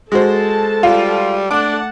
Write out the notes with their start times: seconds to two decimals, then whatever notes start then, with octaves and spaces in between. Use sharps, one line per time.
0.12 G#3 F#4 A4 C5 A5
0.83 G3 F4
1.51 A3 D4 F#5 A5 D6